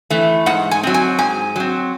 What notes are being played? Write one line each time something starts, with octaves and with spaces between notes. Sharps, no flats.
E3 A3
G#2 F#5
G#5
F#3 C4
G#5
G#2 G#5
F#3 C4